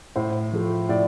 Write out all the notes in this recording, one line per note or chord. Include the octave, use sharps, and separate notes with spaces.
A2 C5
F3 A3
A2 D5